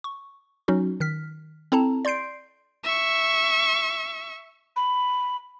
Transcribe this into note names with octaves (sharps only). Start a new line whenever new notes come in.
C#6
F#3 C#4 D#4 F#4
D#3 F6 B6
C4 E4 A4 A5 A#5
D5 C6 G6 C7 D7
E5 C#6
B5